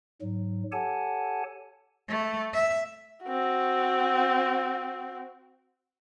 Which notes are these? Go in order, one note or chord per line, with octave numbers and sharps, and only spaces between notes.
G#2 F#3
G4 A4 C#5 F#5 G#5 A5
A3
E5
C4 F#4